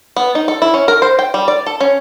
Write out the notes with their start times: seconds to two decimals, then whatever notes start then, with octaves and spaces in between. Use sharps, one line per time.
0.17 B3
0.35 D#4
0.48 A4
0.62 E4
0.74 C#4
0.88 A#4
1.02 C5
1.19 G5
1.34 G3
1.48 D5
1.66 A4
1.81 C#4